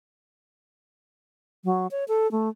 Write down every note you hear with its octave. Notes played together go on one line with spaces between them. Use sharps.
F#3
C#5
A4
A3